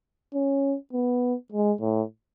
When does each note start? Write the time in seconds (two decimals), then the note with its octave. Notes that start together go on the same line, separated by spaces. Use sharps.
0.34 C#4
0.93 B3
1.52 G#3
1.81 A2